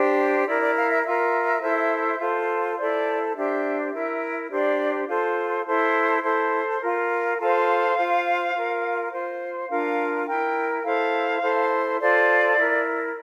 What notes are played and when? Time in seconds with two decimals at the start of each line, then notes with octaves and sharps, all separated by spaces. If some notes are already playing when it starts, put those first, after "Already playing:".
Already playing: D4 G4 C5
0.47 E4 A#4 D5
0.61 D5
0.76 F5
0.90 E5
1.05 F4 A#4 E5
1.62 E4 A4 C5
2.20 F4 A4 C5
2.78 E4 A4 C5 D5
3.35 D4 G4 C5 E5
3.93 E4 A#4 E5
4.50 D4 G4 C5 D5
5.07 F4 A4 C5
5.66 E4 A4 C5
6.23 E4 A4 C5
6.80 F4 A#4
7.38 F4 A4 C5 F5
7.96 F4 C5
8.54 F4 A#4
9.12 F4 C5
9.69 D4 F4 A#4 F5
10.27 E4 A#4 G5
10.84 E4 A4 C5 F5
11.42 E4 A4 C5
12.00 F4 A4 C5 D5
12.56 E4 A#4